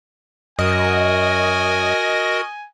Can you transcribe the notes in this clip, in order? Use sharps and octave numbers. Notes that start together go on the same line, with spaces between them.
F#2 F#4 A#4 D#5 G#5